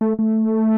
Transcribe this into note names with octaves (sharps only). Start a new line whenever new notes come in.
A3
A3